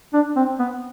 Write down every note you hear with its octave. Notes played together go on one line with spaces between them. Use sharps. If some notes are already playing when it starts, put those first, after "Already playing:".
D4
C4
B3